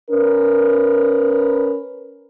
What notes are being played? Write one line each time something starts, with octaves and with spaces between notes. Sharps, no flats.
C#4 A#4 B4